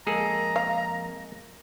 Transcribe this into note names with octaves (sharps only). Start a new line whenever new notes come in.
F2 G#3 A#3 G#4 A4 A#5
F5